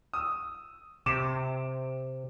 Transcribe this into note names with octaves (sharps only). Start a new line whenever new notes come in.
D#6 E6
C3 D6 E7